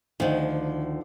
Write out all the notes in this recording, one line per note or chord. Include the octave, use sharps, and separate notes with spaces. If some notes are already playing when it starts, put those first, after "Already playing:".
D2 D3 D#3 F3